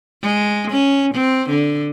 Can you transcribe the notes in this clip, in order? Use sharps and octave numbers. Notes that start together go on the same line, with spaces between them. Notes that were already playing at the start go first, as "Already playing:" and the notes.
G#3
C#4
C4
D3